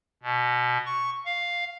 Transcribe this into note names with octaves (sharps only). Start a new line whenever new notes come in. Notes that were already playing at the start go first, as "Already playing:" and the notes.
B2
C#6
F5